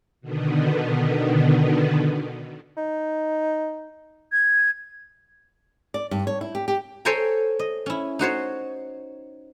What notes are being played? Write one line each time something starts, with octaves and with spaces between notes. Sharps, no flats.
B2 D3 D#3 B3
D#4
G#6
D5
G2
C#5
E4
G4
G4
A4 C5 C#5 G5 G#5 A#5
D#5
C#4 E4
D#4 F#4 C5 C#5